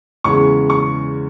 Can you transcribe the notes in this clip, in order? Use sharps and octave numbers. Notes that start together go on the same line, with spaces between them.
E2 C#3 G#3 C#4 C#6
C#6